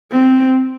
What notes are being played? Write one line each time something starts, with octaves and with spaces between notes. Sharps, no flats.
C4